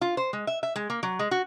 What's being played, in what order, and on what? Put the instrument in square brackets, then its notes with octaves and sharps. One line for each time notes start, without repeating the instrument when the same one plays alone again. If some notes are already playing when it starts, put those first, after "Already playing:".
[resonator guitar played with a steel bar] F4
C5
G#3
E5
E5
G#3
A#3
F#3
G#3
F#4